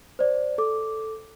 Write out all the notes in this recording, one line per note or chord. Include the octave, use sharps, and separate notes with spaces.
C5 D5
A4 D6